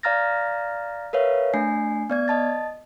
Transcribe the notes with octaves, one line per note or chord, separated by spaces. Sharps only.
D5 F5 A#5 F6 A6 A#6
A#4 B4 C#5 E5 F5
A3 D4 G#5 C7
B3 D5 G#6
D#5 A5 A6